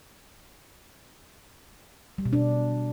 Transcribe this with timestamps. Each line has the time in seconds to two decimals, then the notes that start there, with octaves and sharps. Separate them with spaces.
2.18 G3
2.26 B2
2.33 D4